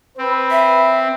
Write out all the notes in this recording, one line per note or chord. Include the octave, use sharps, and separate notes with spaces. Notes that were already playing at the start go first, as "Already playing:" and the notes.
C4 B4
E5